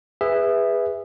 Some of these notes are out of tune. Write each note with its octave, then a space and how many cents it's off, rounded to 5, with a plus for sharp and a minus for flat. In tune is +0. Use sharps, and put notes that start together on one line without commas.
G#4 -25 B4 +0 E5 +0